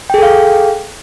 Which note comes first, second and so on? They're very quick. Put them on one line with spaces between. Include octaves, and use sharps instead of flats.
G5 G#4 A4 F5